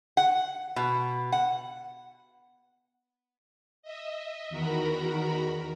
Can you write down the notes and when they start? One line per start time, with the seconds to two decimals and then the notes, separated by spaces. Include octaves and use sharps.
0.17 F#5
0.76 B2
1.32 F#5
3.82 D#5 E5
4.49 E2 D#3 F#4 A#4 A#5 B5